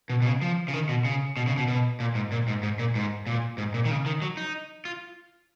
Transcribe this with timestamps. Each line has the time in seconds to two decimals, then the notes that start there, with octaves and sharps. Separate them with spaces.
0.10 B2
0.22 B2
0.26 C#3
0.42 F3
0.68 C#3
0.73 D#3
0.89 B2
1.05 C#3
1.37 B2
1.47 C#3
1.57 B2
1.68 B2
2.00 A#2
2.15 G#2
2.32 A#2
2.48 G#2
2.63 G#2
2.79 A#2
2.95 G#2
3.27 A#2
3.58 G#2
3.74 A#2
3.85 D#3
3.91 C#3
4.06 D#3
4.22 F#3
4.37 D#4
4.85 F4